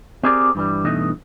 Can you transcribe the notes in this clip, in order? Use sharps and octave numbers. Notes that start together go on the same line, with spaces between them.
C4 G4 G#4 A#4 D5
G2 E3 G3
G2 B2 E3 A3 D#4 D#5